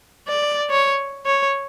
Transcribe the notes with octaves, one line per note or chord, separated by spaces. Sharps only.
D5
C#5
C#5